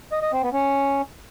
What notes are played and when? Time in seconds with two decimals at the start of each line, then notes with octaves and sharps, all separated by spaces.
0.12 D#5
0.22 D#5
0.33 C4
0.43 B3
0.53 C#4